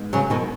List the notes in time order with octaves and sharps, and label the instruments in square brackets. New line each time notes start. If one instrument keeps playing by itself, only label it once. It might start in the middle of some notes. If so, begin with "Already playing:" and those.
Already playing: [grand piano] G#2 G#3 B3
[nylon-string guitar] C#3 F#3
B2 D#3